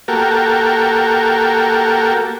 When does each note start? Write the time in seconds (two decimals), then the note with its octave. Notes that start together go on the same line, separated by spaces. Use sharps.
0.08 A#3 F#4 G4 A4 A#4